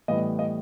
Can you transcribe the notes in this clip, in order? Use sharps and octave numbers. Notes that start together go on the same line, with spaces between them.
A2 E3 G3 B3 D#5
D#5